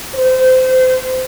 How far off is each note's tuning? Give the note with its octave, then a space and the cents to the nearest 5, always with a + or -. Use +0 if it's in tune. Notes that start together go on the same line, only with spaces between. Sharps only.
C5 -25